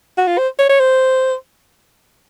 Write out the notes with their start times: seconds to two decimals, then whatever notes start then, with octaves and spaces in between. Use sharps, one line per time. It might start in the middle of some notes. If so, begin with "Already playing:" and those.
0.18 F#4
0.27 F4
0.38 C5
0.59 C#5
0.69 C#5
0.80 C5